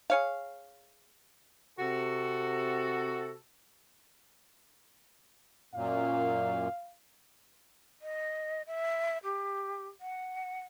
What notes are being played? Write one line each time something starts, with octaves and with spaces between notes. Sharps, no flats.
G#4 C#5 F5
C3 F#4 A4
F#2 A#2 F5
D#5
E5
G4
F#5